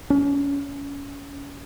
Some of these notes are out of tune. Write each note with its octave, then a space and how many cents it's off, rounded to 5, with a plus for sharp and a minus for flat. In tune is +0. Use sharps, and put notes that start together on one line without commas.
C#4 +25